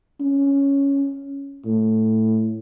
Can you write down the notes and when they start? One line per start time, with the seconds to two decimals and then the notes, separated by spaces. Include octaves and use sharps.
0.20 C#4
1.65 A2